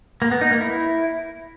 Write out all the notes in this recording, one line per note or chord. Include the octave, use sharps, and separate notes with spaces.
A#3
B3
D#4
A#3
E4